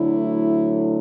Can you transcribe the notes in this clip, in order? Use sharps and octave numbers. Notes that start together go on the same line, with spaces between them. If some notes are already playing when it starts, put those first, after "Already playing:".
Already playing: D2 D3 F#3 A3 E4